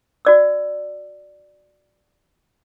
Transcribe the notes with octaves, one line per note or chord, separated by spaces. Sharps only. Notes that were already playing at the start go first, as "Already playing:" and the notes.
F#4 D5 E6